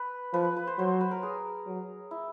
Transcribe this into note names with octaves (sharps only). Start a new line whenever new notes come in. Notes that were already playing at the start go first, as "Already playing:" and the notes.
Already playing: B4
F3 B4
B4
B4
C5
F#3 C5
B4
A#4
G#4
F#3
E4